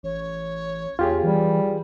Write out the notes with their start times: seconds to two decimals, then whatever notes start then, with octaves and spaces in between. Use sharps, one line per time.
0.03 A1 C#5
0.99 E2 F4 G4 G#4
1.23 E3 G3